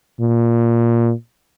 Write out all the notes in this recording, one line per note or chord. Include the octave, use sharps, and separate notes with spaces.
A#2